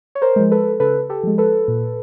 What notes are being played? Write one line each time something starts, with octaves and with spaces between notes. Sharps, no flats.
C#5
A#4 C5
F3 G#3
A4 B4
C#3 A4 B4
G4 A4
F3 G#3
A4 B4
A#2